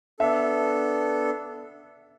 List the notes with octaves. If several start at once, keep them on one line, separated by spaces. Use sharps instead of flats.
B3 D4 A4 E5